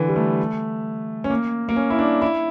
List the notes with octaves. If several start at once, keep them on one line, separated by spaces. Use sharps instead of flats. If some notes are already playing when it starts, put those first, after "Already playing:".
Already playing: D3 E3
G3
A3
C#4
A#3
A#3
C#4
E4
D4
E4